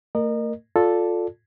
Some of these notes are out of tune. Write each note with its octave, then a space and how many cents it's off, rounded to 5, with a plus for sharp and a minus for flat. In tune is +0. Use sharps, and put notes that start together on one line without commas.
A3 +45 A#4 +0 D#5 -35
F4 +20 A4 +0 D5 +0